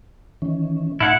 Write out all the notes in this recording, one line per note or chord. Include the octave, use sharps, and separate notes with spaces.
D#3 E3 C#4
A2 D#4 E4 F#5 A5